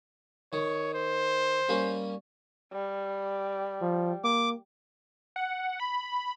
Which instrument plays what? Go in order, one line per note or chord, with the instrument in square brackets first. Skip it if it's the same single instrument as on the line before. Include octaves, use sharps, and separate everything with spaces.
[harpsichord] D#3 [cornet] C#5
[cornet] C5
[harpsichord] G3 A#3 C#4
[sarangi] G3
[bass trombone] F3
[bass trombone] A#3 [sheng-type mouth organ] D6
[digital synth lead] F#5
B5